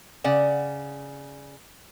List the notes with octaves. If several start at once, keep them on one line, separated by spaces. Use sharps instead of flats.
C#3 D5 F#5